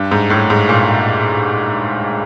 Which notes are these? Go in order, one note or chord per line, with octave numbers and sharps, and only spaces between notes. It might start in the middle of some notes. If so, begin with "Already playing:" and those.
Already playing: G2
G#2
A2
G#2
A#2